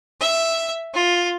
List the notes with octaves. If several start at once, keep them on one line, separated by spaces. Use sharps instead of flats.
E5
F4